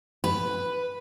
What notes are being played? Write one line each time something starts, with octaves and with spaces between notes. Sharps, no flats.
B4